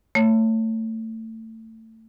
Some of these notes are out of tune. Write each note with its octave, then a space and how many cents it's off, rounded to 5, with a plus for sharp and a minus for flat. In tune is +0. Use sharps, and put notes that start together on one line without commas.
A3 +25 C#5 +0